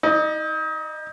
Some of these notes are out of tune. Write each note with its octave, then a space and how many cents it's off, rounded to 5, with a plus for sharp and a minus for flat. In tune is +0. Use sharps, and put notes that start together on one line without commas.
D#4 +35 D#5 -30